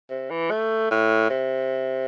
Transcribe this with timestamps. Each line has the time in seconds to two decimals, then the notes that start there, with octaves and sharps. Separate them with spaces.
0.10 C3
0.30 E3
0.50 A3
0.91 A2
1.30 C3